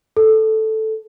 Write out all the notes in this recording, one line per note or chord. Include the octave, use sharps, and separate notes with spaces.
A4